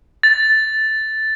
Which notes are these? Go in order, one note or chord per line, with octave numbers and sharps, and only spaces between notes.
A6